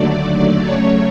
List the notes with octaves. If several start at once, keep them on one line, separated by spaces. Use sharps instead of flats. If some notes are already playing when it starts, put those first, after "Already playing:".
Already playing: D#2 D3 F#3 A3 D5
F#2 C#3 F#3 A3 C#5